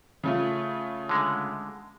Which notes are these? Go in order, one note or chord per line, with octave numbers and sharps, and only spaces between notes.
C#3 A3 F4
D3 G#3